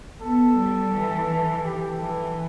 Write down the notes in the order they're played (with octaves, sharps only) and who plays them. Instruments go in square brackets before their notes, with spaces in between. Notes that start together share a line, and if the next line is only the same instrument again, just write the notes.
[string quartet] B3 [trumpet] A4
[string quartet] G3
E3
E3
[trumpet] G4
[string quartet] E3 [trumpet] A4